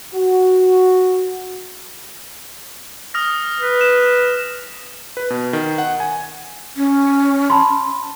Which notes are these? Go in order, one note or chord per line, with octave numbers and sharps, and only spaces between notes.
F#4
D#6 F6 A#6
B4
E7
B4
B2
D#3
F#5
G#5
C#4
A5 B5 C6